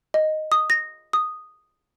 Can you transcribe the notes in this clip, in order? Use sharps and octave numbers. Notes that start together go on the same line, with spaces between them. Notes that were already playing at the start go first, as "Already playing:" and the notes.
D#5
D#6
A#6
D#6